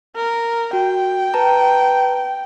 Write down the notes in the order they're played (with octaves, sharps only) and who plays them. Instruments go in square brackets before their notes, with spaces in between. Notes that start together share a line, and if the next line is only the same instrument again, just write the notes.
[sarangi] A#4
[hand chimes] F#4 [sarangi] G5
[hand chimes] B4 A5 A#5